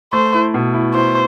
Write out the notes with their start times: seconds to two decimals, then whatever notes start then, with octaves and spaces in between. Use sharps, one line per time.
0.13 A3 C5
0.34 E4
0.54 B2
0.74 E4
0.94 E4 C5